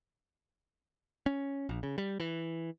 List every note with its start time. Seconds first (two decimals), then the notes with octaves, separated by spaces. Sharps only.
1.26 C#4
1.69 A#1
1.83 C#3
1.98 G3
2.20 E3